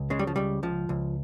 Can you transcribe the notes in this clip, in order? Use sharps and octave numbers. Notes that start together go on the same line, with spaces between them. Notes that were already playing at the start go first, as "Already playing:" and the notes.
Already playing: C#2
C#3 G#3
G3
F3
C#2 G3
C#2 F3
C#2